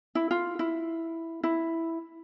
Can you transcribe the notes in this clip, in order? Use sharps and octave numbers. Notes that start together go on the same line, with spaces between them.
E4
F4
E4
E4